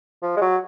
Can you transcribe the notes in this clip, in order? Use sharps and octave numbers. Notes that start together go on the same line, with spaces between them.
F3
G#3
F#3